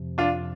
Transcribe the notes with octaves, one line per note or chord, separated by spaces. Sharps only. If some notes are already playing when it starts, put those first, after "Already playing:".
Already playing: F2 C3 F3
D4 F4